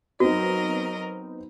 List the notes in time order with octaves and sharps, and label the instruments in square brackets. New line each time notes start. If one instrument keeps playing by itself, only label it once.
[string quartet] F#3 A#4 D#5 [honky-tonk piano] B3 C4 D#4 [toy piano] F#4